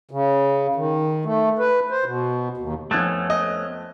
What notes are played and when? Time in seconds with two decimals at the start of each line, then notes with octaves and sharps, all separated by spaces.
0.11 C#3
0.75 D#3
1.25 A3
1.59 B4
1.91 C5
2.04 B2
2.57 D#2
2.91 F2 A3 B3 C#4 F#6 A6
3.30 D#5